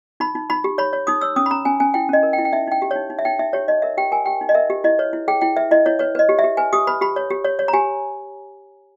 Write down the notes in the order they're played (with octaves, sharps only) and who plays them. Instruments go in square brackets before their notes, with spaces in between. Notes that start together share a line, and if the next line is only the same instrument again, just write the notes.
[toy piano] D#4 B5
D#4
D#4 B5
G4
C#5 B5
C#5
D#4 D#6
C#5 E6
C#4 D#6
B5
C#4 A#5
C#4 G#5
C#4 G#5
E4 G5
C#4 D#5
A#4
G5
E4
G5
D#4 E5
D#4 G5
G4
D#4 C#5
D#4
E5
D#4 G5
D#4 E5
G4 C#5
D#4 D#5
A#4 E5
G4 G5
A#4 G#5
G4 G5
D#4
D#5
A#4 E5
G4
E4 D#5
B4 C#5
E4
G#4 G5
E4 G5
B4 E5
E4 D#5
E4 C#5
B4 C#5
B4 D#5
G4
E5
G4
B4 G#5
G4 D#6
B4 B5
G4 B5
C#5
G4
C#5
C#5
A#5
G4 G#5